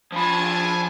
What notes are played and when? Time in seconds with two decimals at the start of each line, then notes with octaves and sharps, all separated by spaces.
0.12 F3 D4 F4 G#5 A5 B5